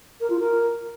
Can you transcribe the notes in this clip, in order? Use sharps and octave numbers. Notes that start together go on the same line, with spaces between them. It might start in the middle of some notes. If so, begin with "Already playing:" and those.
A#4
F4
A#4